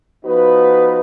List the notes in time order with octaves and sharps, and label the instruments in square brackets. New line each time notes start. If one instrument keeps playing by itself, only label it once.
[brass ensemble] F3 B3 D#4 F#4 B4